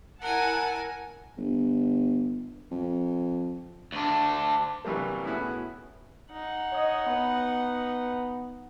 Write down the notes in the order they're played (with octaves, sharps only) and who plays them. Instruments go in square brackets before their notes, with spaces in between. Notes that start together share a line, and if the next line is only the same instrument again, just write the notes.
[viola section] E4 F#5 A5 [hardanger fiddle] A#4 G#5
[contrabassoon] G1
F2
[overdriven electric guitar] D2 D4
[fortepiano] C2 E3 F#3 G3 A#3
A2 B3 C#4 E4 F#4 G#4
[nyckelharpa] D#4 F#5
[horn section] C#5 D#5
B3